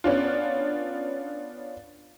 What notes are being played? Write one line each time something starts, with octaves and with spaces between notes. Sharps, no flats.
B3 C#4 D4 F4